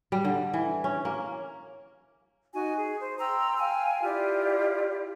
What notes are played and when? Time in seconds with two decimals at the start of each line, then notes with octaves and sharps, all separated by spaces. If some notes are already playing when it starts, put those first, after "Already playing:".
0.12 G3
0.24 D3
0.54 E3
0.84 C#4
1.05 A#3
2.53 D#4 F#4 G#5
2.77 G#4
2.99 C5
3.19 G5 A#5 C6 E6
3.59 F5 G5 G#5
4.02 E4 F4 G4 D5